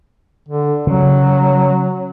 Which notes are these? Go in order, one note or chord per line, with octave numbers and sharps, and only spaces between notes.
D3
C#3 F#3